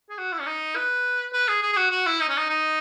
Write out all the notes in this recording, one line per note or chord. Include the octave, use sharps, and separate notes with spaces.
G#4
F#4
E4
C#4
D#4
B4
B4
G#4
G#4
G#4
F#4
F#4
E4
D#4
C#4
D#4
D#4